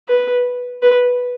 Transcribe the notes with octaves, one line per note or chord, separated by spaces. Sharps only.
B4
B4